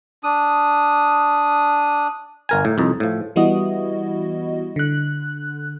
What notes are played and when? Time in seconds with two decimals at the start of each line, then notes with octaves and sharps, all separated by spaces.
0.24 D4 D#6
2.49 G1 A#4 G#5
2.65 A2
2.78 C2 F2 D#4
3.00 A2 F3
3.36 E3 G3 B3 E4 F#4 D#5
4.76 D3 F#6